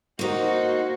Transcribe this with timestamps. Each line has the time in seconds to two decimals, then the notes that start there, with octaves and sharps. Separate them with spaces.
0.19 A#3 D#4 F#4 C5